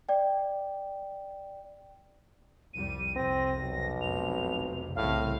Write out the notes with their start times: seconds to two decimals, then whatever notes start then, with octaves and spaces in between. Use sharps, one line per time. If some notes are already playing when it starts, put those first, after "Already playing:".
0.09 D5 G5
2.74 C2 F2 G3 D#7
3.16 C2 F2 C4 A#6
3.59 B1
4.01 F1 F2 C3 F7
4.96 C2 A2 C#3 C4 F5